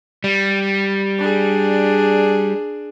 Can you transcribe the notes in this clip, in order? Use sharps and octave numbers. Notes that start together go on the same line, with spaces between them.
G3
D4 G#4